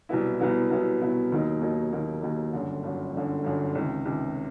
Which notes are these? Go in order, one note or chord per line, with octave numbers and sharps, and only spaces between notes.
C2 B2 F#3 B3 E4
C2 B2 F#3 B3 E4
C2 B2 F#3 B3 E4
C2 B2 F#3 B3 E4
D#2 D#3 F#3 A#3 D#4
D#2 D#3 F#3 A#3 D#4
D#2 D#3 F#3 A#3 D#4
D#2 D#3 F#3 A#3 D#4
G1 F#2 D3
G1 F#2 D3
G1 F#2 D3
G1 F#2 D3
C#2 C3 D#3
C#2 C3 D#3